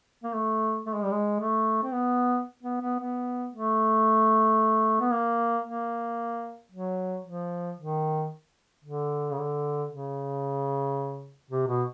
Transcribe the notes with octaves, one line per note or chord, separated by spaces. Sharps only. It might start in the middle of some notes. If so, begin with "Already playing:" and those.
A#3
A3
A3
G#3
G3
G#3
A3
C4
B3
B3
B3
B3
A3
B3
A#3
A#3
F#3
F3
D#3
D3
C#3
D3
C#3
C3
B2